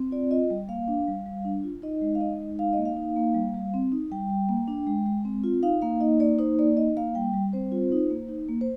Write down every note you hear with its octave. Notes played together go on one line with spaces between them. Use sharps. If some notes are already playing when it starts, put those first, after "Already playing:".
Already playing: C4
F4 D5
F4 D#5
G3
A#3 F5
D4
G3
G3
D4
F4
D#4 D#5
G#3
F5
D#4 D#5
G#3
D#4 F5
A#3 D#5
F5
D#4
A#3
G3
G3
C4
D#4
G3 G5
G3
A#3
D4
G#3
G#3
C4
F4
D#4 F5
A#3 F5
D#4 D#5
A#3 D5
D#4 C5
A#3 D5
D#4 D#5
A#3 F5
G3 G5
G3
C4 C5
F4
D#4
A#3
D#4
A#3
C5